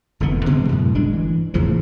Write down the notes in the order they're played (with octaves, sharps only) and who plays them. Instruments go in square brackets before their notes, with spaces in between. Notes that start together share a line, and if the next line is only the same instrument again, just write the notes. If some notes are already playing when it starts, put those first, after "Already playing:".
[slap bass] F1 D3 E3 B3
B2 D3 E3 G#3
F#2 A2
G1 G#3 D4
E3
E2 A2 C#3 F3